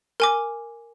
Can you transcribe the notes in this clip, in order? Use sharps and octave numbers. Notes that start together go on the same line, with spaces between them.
A#4 G#5 D6